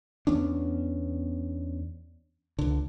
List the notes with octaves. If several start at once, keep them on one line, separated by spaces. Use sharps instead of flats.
E2 B3 C#4 D4
C#2 D3